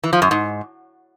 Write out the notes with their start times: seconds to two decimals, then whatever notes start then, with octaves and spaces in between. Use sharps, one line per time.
0.04 E3
0.13 F3
0.22 F#2
0.31 G#2